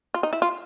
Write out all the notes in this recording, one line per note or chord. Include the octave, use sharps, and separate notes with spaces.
F4
D#4
E4
F4